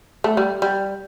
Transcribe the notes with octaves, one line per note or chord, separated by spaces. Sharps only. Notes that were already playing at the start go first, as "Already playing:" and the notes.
A3
G3
G3